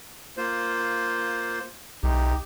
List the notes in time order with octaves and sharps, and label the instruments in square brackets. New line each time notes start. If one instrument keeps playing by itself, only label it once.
[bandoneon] A#3 F4 C5
[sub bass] B1 [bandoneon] D#4 G4